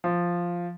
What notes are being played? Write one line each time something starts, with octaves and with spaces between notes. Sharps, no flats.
F3